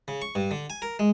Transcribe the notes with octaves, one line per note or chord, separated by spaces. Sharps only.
C#3
C#6
G2
D3
G#5
A#4
G#3